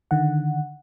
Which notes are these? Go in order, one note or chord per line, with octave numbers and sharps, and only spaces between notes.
D3 D#3 F#5